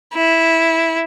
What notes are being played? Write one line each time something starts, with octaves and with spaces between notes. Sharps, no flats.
E4